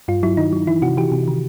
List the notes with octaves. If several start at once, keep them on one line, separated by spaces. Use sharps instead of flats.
G2 F4
F#3 E4
D#3 D#4
F#3
E3 E4
C3 F#4
E3 G4
C3
D#3